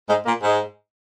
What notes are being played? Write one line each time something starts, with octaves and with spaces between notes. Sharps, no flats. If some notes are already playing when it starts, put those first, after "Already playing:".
G#2 G#3
A#2 A#3
G#2 G#3